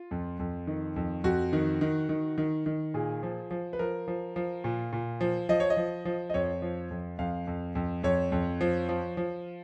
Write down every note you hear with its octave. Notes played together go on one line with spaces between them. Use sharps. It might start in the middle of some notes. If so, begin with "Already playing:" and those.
Already playing: F4
F2
F2
D#3
F2
F2 F#4
D#3
D#3
D#3
D#3
D#3
A#2 G#4
F3
F3
B4
F3 A#4
F3
F3
A#2
A#2
F3
F3 D#5
C#5
D#5
F3
F3
D#5
F2 C#5
F3
F2
F2 F5
F2
F2
F2 C#5
F2
F3
F3
F3